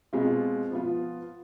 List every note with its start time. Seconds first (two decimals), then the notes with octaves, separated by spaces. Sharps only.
0.13 B2 G#3 C4 F4
0.71 F3 B3 F4